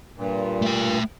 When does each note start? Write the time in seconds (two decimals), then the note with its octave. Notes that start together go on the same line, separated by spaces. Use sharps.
0.16 G2 A#2
0.62 A3 G5